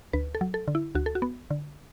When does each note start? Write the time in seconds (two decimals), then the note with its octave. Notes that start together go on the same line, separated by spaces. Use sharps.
0.13 D2 B4
0.35 A4
0.41 F#3
0.54 A4
0.68 D3
0.75 E4
0.95 D2 F#4
1.06 A4
1.15 F#4
1.22 B3
1.51 D3